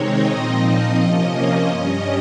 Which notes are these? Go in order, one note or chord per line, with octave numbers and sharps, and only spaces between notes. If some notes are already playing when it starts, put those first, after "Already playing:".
Already playing: C3 D#3 G#3 C4 D#4 C#5 D#5
A#2 F3 C4 D#4
C3 F3 A#3 C#4
G2 G3 C#4 D#5